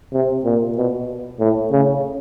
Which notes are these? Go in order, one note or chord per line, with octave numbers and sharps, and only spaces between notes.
C3
A#2
B2
A2
C#3